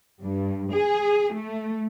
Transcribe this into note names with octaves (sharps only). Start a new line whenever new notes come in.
G2
G#4
A3